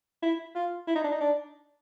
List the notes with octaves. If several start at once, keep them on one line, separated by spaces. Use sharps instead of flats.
E4
F4
E4
D#4
D4
D#4
D4